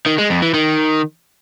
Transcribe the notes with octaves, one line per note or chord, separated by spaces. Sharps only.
D#3
G#3
F2
E3
D#3